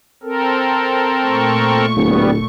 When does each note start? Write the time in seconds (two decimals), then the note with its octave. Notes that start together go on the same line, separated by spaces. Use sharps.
0.23 C4 A4 A#4
1.24 A#2 A3 C#6
1.97 D1 G3 B3